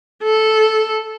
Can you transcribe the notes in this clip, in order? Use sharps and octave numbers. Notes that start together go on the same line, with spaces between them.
A4